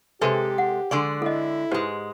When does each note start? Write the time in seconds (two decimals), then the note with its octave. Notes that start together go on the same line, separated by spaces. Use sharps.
0.21 C3 G#3 G4 A4 B4 C5
0.58 F#5
0.91 D3 G#3 D5 C6 C#6
1.22 E4 A4 D#5
1.71 G#2 G#3 G4 B4 C5